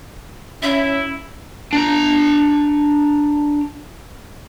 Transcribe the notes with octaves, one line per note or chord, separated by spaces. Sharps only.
C#4 E4 E5
D4 A#5